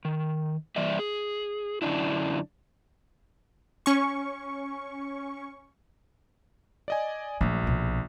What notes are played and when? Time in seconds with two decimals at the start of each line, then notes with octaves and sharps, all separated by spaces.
0.05 D#3
0.76 E3 G3 D5 E5
0.99 G#4
1.82 F#2 D3 G3 C#4 D4 E4
3.86 C#4 C#6
6.88 D5 D#5 G#5
7.41 A#1 F#3 A3
7.63 D1 B1